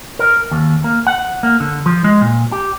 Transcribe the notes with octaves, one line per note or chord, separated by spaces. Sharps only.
A#4
D#2
A#3
F#5
A#3
D3
F3
G#3
A#2
G4